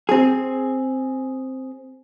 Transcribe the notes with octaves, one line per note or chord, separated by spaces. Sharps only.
C4 G#4